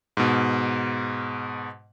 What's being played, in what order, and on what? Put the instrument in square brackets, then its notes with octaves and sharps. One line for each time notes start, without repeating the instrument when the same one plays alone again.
[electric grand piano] G#2 B2